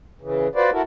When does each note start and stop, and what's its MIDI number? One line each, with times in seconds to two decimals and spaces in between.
0.22 0.48 49
0.22 0.48 52
0.55 0.70 65
0.55 0.70 66
0.55 0.70 71
0.55 0.70 72
0.55 0.70 74
0.72 0.82 64
0.72 0.82 66
0.72 0.82 69
0.72 0.82 70